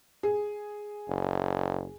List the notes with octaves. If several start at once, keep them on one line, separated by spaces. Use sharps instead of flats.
G#4
F#1